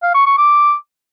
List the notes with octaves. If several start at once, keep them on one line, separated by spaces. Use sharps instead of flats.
F5
C#6
C#6
D6